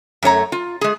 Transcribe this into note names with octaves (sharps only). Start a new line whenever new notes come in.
F#2 A3 C#5 A#5
F4
G#3 G#4